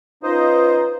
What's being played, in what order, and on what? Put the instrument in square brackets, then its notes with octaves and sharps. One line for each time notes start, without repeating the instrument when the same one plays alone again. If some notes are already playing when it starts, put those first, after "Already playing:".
[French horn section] C#4 F4 B4 [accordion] D#4 C5 D#5